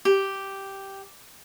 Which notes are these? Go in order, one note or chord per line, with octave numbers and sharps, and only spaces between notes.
G4